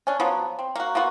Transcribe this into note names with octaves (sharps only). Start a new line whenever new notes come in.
C#4 D4
F3 F#3 B3
C4
A#3 F#4
A#3 B3 F4 F#4